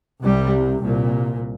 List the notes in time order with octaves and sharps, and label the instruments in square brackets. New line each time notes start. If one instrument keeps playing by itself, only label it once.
[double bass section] C2 C3 G3
C2 A#2